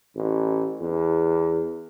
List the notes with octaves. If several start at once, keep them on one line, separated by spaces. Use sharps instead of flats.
A1
E2